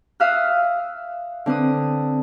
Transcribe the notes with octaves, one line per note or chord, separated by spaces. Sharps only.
E5 F5 D#6 F6 F#6
D3 C4 B4 D#6